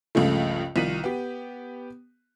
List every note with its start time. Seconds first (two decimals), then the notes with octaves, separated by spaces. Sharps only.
0.15 C#2 G2 C#3 F3 A3
0.76 C2 D#3 F3 B6 D#7 F#7
1.04 B3 G4